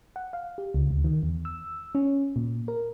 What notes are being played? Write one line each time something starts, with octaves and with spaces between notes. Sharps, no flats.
F#5
F5
G4
C#2
D2
D#3
E2
E6
C#4
A#2
A#4